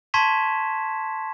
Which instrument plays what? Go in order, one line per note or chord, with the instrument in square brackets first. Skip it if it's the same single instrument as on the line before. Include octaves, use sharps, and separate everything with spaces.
[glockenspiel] A5 C6 C#6 G#6 B6 E7